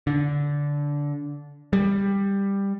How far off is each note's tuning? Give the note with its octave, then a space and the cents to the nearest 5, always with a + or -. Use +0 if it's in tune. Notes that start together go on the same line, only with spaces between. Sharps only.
D3 -15
G3 +15